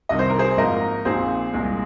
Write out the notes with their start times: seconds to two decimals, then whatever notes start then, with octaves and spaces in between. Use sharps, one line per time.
0.09 C2 C3 D#3 D#5
0.19 C5
0.30 A#4
0.39 G#4 C5
0.57 G#1 G#2 F3 A#3 A#4 D#5
1.05 A#1 A#2 F3 C4 D#4 G#4 C5
1.53 C2 A#2 G#3